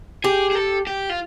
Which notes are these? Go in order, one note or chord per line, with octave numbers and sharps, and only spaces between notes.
G4 G#4
G#4
A4
G4
F4